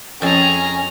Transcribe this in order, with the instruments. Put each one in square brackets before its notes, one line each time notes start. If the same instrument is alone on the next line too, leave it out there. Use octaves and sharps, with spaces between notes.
[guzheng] F2 A5 [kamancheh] C#4 [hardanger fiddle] G#4 A#5